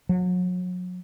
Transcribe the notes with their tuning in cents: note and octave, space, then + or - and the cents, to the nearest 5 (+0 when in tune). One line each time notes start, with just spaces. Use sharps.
F#3 -35